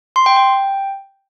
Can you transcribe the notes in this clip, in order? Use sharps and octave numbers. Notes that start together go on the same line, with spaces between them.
C6
G5
G5